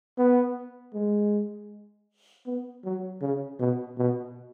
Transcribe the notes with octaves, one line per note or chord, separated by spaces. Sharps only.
B3
G#3
B3
F#3
C#3
B2
B2